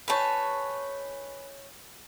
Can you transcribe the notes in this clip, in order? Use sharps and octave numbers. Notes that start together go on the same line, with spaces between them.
D#4 G#4 B4 C#5 A5